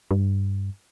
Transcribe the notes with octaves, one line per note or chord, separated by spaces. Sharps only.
G2